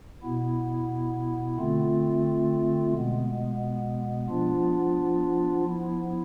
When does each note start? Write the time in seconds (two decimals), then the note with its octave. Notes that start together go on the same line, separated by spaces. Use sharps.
0.23 B2 B3 E4
1.59 D3 A3 C4 F4
2.94 B2 G#3 B3
4.29 F3 B3 D4 F4
5.64 F3 B3 E4